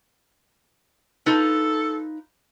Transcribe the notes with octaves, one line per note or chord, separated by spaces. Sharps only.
D#4 F4 A4 B4